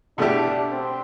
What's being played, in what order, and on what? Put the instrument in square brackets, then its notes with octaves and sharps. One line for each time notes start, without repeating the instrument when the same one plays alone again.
[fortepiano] B2 A3 E4 G4 [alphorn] D4
[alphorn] C4